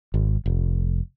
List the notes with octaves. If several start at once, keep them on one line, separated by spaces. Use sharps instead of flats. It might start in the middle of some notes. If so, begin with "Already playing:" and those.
G#1
F1